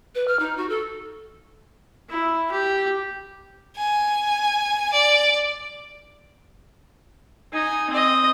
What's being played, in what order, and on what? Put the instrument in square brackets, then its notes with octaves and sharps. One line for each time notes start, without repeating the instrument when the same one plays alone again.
[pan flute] B4
F6
D#4
F#4
A4
[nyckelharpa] E4
G4
[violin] G#5
D5
[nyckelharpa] D#4 G#5
C4 D#5